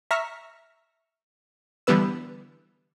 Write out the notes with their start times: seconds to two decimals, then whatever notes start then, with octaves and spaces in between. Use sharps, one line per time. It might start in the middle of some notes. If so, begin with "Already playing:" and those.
0.11 E5 A#5 C#6 F6 A#6 B6
1.87 D3 E3 G3 B3 B4 E6